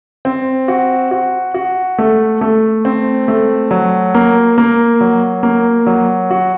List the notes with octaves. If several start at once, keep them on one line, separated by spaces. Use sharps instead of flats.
C4
F#4
F#4
F#4
A3
A3
C4
A3
F#3
A#3
A#3
F#3
A#3
F#3
F#4